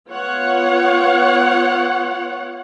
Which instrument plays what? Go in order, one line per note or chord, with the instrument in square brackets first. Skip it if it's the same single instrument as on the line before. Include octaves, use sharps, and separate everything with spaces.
[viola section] B3 F4 C#5 F#5